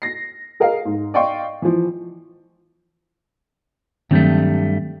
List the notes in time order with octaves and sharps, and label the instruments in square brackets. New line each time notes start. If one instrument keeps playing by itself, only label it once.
[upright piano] A#6 C7
G#4 A#4 D#5 F5
G#2
D5 D#5 F5 G5 C6 C#6
E3 F3
[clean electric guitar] G2 G3 A3 [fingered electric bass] D#3 F#3 C4